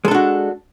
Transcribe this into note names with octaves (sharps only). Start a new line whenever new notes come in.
G#3 D4 F#4 A4